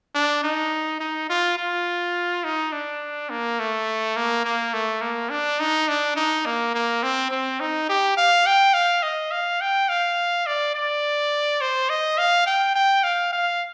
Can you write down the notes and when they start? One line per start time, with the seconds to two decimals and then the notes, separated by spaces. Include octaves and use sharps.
0.15 D4
0.43 D#4
1.00 D#4
1.30 F4
1.57 F4
2.44 D#4
2.72 D4
3.30 A#3
3.59 A3
4.16 A#3
4.45 A#3
4.73 A3
5.01 A#3
5.30 D4
5.59 D#4
5.88 D4
6.16 D#4
6.46 A#3
6.74 A#3
7.03 C4
7.31 C4
7.60 D#4
7.89 G4
8.17 F5
8.46 G5
8.74 F5
9.02 D#5
9.31 F5
9.61 G5
9.89 F5
10.46 D5
10.75 D5
11.61 C5
11.89 D#5
12.18 F5
12.46 G5
12.75 G5
13.04 F5
13.33 F5